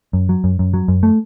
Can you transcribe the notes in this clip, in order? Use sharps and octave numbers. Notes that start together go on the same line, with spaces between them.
F#2
F#3
F#2
F#2
F#3
F#2
A3